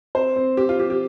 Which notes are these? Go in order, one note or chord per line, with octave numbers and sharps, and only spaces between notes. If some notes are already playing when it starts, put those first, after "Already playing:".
C4 C5
C4
C4 G4
F4
C4 G4
G4